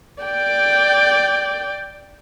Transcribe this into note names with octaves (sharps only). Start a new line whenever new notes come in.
D5 G5